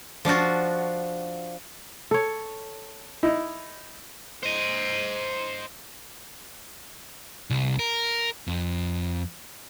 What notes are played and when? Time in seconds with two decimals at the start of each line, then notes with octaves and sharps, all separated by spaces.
0.25 F3 D4 F4 F#4
2.11 A4 C#5
3.23 D#4 E4
4.43 C5 D#5
7.50 C2
7.79 A#4
8.48 F2